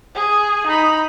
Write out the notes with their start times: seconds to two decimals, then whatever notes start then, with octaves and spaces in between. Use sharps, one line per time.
0.15 G#4
0.67 D#4 B5